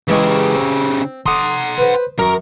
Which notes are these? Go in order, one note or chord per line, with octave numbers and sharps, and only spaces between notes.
C#3 E3 G#3 C#4 G4
C4
F#5 A#5 C6 D6 D#6
B4 C5
F#2 A#4 C#6